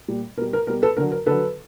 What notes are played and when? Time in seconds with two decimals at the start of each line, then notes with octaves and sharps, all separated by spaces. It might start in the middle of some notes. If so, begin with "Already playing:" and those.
0.08 A#2 G3
0.37 B2 A#4
0.42 G3
0.53 A#4
0.67 B2 G3 A#4
0.82 A4 B4
0.97 D3 F#3 A#4
1.12 A#4
1.26 D3 F#3 A4 B4